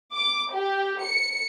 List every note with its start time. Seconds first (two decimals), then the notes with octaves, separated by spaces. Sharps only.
0.14 D6
0.53 G4
1.02 C#7